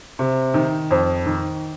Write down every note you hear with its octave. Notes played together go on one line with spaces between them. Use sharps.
C3
D#3
F2
D#3